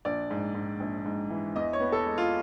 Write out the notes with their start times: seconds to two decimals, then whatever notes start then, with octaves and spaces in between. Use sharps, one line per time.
0.05 A#1 D5
0.30 G#2
0.55 G#2
0.80 A#1
1.05 G#2
1.30 E3
1.55 E2 D#5
1.73 C#5
1.80 B3
1.92 A4
2.05 G#3
2.18 F4